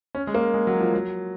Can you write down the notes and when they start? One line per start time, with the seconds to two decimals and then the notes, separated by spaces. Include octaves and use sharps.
0.15 C#4
0.27 G#3
0.34 A#3
0.54 G#3
0.67 F#3
0.80 F3
0.94 F#3